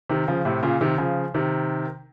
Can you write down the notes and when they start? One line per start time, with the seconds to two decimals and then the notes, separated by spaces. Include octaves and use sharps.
0.09 C3 D#3
0.28 C#3 F3
0.45 A2 C3
0.63 A#2 C#3
0.81 C3 D#3
0.98 C#3 F3
1.34 C3 D#3